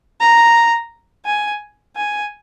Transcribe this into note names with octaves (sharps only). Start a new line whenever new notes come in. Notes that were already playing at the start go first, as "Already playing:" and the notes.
A#5
G#5
G#5